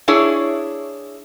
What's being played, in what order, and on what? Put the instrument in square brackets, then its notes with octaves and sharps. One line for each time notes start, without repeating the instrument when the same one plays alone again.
[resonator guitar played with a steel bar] D4 E4 G#4 C#5